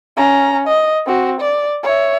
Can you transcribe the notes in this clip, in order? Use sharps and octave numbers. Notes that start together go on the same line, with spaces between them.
C#4 A#5
D#5
C4 F#4
D5
C#5 E5